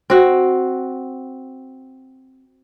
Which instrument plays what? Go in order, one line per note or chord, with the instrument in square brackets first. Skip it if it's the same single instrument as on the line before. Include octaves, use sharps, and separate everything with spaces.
[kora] C4 F#4